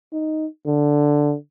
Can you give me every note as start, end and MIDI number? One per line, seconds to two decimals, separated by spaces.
0.13 0.46 63
0.66 1.34 50